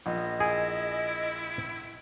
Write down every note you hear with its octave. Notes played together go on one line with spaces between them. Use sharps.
A#1 D#5
E4 G#4